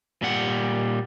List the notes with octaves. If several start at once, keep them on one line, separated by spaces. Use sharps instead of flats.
A#2 G3 F#5